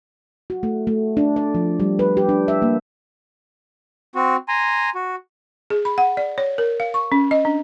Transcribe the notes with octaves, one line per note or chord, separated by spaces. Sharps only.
F#4
A3
A3
D4
D5
F3
G3
B4
G4
D4
E5
A#3
C4 F#4
G#5 A#5 C6
F#4
G#4
B5
F#5
D5
C#5
A#4
F5
C#6
C#4
D#5
D4